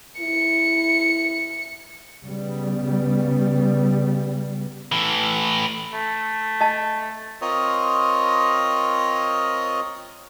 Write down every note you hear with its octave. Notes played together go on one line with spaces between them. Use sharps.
E4 C#7
C#3 G3 B3
A2 E3
A3
D#5 A5
C4 F4 A#4 C#5 D#5 D#6